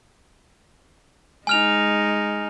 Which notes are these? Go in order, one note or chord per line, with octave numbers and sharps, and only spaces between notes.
G#3 D#4 G#5 F6 F7